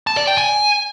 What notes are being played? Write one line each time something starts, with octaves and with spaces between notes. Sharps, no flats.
A5
D5
G5
G#5